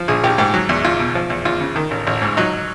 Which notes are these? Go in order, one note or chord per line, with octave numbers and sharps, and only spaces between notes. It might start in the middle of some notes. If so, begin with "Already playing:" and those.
Already playing: F3
A#1 G#4
A#1 G4
G#2 G4
F#3
E2
E2 F4
B2
F3
E2
E2 F4
C#3
D#3
A1
A1
G#2
F#3 D#4